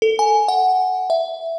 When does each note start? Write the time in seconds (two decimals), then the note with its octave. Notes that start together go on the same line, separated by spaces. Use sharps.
0.02 A4
0.19 G#5
0.48 F#5
1.10 E5